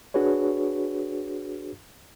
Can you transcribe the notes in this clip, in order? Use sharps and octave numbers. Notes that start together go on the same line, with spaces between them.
D4 F#4 G#4 B4 C#5